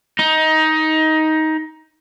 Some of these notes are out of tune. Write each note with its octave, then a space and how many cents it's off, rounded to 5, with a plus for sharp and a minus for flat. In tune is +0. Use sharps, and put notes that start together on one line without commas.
D#4 +15